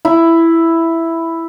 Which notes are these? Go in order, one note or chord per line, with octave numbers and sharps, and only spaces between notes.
E4